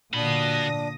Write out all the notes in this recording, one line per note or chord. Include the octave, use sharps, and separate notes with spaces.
A#2 D3 D4 F#4 B5 D#6 A#6